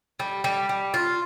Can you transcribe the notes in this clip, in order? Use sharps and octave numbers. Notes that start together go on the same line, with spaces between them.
G3
G3
G3
F4